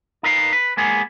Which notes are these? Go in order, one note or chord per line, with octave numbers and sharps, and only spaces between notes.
D#4 A#4 B4 F5
B4
G#3 A#3 B3 G#4